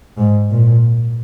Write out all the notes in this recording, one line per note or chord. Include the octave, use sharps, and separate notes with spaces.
G#2
A#2